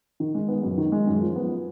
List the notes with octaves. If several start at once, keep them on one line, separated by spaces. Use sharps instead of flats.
D#3
G#3
B3
F#2
D#3
G#3
F#2
F3
B3